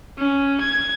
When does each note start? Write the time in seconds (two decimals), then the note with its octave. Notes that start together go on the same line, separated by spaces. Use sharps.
0.18 C#4
0.60 G#6